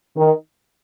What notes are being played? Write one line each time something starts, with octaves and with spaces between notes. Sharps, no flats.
D#3